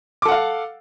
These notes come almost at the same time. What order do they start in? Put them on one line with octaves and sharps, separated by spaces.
D6 A4 F#5 F5